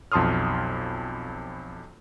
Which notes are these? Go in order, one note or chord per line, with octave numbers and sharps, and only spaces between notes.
B1 F2 A5 C6 D#6 F6